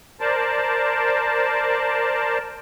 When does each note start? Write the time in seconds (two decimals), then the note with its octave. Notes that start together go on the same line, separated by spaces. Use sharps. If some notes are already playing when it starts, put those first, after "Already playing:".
0.21 A#4 C5 D5 A5